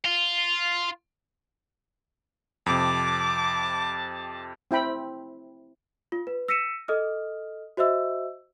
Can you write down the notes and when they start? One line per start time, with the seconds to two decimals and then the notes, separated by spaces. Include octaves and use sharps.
0.05 F4
2.66 F2 C3 A5 D6
4.71 C4 E4 G5 B5
6.12 F4
6.27 B4
6.48 E6 A#6 B6 C#7 D#7 E7
6.88 A4 D#5 D#6 F6
7.77 F#4 C5 D#5 E5 E6